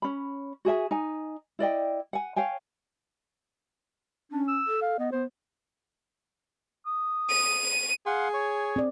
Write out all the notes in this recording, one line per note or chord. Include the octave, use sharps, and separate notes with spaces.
C#4 B5
F#4 G#4 E5 G#5
D#4 G#5
E4 D5 D#5 G5
F#5 G#5
C#5 F5 G5 G#5
C#4 D4
E6
A4
F5
B3 D#5
B3 C5
D#6
D#7
G#4 F5 F#5 C6
C#5 C#6
C4 D5